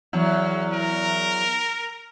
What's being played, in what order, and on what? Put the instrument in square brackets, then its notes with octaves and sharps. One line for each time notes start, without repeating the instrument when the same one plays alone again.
[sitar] E2 F#3
[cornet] A#4